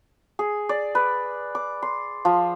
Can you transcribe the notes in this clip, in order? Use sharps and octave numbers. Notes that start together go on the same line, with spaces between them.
G#4
D5
B4
D6
C6
F3